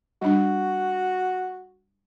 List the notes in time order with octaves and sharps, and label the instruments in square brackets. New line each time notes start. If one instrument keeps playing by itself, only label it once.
[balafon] G3 D4 [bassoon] F#4